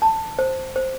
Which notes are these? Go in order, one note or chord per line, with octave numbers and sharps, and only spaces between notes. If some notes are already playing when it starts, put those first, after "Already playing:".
A5
C5
C5